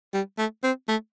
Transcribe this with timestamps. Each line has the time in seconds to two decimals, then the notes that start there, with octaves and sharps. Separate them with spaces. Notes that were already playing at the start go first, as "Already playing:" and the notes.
0.14 G3
0.38 A3
0.64 C4
0.88 A3